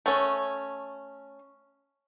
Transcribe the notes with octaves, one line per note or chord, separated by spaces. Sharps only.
A3 C#4